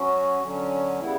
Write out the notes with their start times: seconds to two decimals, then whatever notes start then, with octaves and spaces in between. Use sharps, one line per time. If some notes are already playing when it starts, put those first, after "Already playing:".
Already playing: F#3 C#4 F#4
0.41 D3 F#3 C#4
1.00 C#3 G3 B3 E4